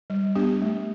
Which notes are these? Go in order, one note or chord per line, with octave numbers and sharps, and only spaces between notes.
G3
B3 D4 G4
A3